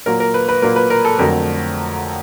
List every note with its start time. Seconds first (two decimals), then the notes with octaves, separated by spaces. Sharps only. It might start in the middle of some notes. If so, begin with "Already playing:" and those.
0.06 A#2 F#3 A#3 A#4
0.20 A#4
0.34 B4
0.49 B4
0.62 A#2 F#3 A#3 A#4
0.76 B4
0.90 A#4
1.05 A4
1.19 F2 D3 F#3 A3 A#4